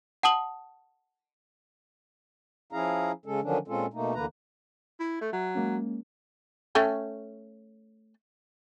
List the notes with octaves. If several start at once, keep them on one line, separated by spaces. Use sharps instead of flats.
F#5 A5 D#6 F#7
F3 C#4 E4 G#4 F5 A#5
C#3 G#3 C#4 A4
D3 D#3 F3 F#3 C#4 D4
A#2 G#3 C4 C#4 F4 A4
B2 A3 A#3 D#4
D2 D3 E3 A#3 B4 A#5
E4
A3 E5
F#3
G#3 A#3 C#4
A3 C#4 G5